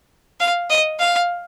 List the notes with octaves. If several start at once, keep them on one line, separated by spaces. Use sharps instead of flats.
F5
D#5
F5